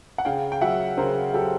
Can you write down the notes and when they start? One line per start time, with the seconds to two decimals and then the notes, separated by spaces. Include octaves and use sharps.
0.18 F#5
0.25 C#3 F5 G5
0.52 G5
0.61 F#3 E5 F#5
0.98 C#3 A#4 C5
1.34 F#3 G4 A4